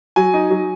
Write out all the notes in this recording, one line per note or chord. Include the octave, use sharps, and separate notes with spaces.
F#3 G#5
D#4
F#3